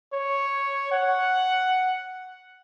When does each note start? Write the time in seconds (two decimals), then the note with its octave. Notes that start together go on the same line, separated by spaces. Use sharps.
0.13 C#5
0.92 F#5